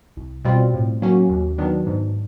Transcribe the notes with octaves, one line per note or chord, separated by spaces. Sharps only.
C2
B2 G3 C4 F4
A2
F#3 A#3 C#4 F#4
D#2
D#3 F#3 B3 D4
G#2